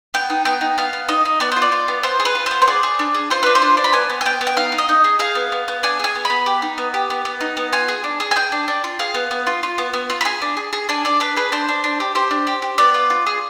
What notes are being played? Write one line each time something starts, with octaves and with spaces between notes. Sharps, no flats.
B3 G5
D#4
B3 G5
D#4
B3 F5
B3
D#4 D#5
D#4
B3 D5
C5
F4
D5
F4
B3
F4 C5
G#4
B4
F4
B3 C5
C5
G#4 D5
G#4
D4
G#4
F4 C5
D4 B4
C5
F4
D4
B5
B3 G#5
B3
G#5
B3 G5
B3
G5
D#4 F5
D#4
D#5
D#4
G#4
G#4 F5
B3
B3
B3
D4 G#5
G#4 G#5
B3
B5
B3
G4
D#4
B3
G4
B3
B3
D#4
B3
F4 G#5
G#4
D4
G#4
G#5
G#4 G5
D4
D4
F4
G#4 F5
B3
B3
F4
F4
B3
B3
F4
B5
G#4 G#5
D4
G#4
G#4
D4 G#5
D4 D5
D4 B4
G#4 B4
D4 C5
D4
D4
G4
G4 C5
D4
G4
G4
B3 D5
F4
F4
G#4